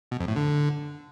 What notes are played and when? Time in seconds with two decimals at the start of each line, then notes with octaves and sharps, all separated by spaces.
0.12 B2
0.20 F2
0.28 A2
0.36 D3